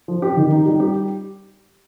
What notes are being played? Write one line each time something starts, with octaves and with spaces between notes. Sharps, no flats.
F3
G4
D#3
D#4
G3
G4